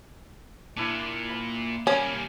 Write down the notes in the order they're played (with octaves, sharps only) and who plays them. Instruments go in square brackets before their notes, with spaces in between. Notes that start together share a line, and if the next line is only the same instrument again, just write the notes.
[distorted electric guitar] A#2 [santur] D4 E4
[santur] B5
[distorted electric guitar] G3 A#3 [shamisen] C#4 [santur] G#5